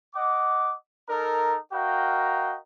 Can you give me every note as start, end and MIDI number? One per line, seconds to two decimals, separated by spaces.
0.15 0.74 75
0.15 0.74 78
0.15 0.74 86
1.09 1.57 63
1.09 1.57 69
1.09 1.57 70
1.73 2.57 66
1.73 2.57 70
1.73 2.57 75
1.73 2.57 77
1.73 2.57 79